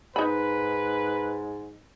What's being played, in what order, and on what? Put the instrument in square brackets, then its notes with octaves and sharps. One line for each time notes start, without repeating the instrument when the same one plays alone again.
[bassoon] G#2 [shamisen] D#4 B5 [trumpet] B4